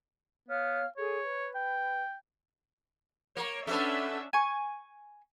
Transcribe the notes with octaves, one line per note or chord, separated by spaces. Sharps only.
B3 C#5 F5 F6
G#4 A4 C#5
B4
G5
A#3 C#5
A3 B3 C#4 D4 E5
G#5 C#6